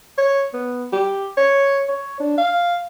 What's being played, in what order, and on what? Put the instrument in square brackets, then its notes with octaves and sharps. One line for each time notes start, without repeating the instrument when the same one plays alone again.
[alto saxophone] C#5
B3
G4
C#5
C#5
D4
F5